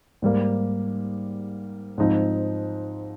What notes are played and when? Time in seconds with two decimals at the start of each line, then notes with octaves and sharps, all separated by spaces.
0.22 G#2 G3 A#3
1.98 G#2 F3 C4 D#4